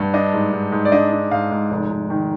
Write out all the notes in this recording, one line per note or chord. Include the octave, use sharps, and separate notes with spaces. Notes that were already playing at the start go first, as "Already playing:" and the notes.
Already playing: G2
D4 D#5
G#2
G#2
G#2
D5
D4 D#5
D4
G#2 F5
G#2
F1
F1
D#3